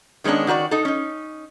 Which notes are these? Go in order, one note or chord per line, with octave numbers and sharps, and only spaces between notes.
D#3 G#3 B3 C#4 D4
D#3 F#4 A4 D5
D#4 A4
C#4 D#4